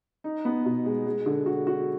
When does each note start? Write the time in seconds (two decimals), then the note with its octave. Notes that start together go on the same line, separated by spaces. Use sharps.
0.24 D#4
0.45 B3
0.65 B2
0.86 G#3
1.06 G#3
1.26 D3
1.46 F#4
1.67 F#4